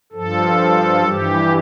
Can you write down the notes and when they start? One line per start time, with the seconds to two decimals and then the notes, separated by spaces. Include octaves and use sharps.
0.12 G2 F3 A4
1.05 G2 E3 G4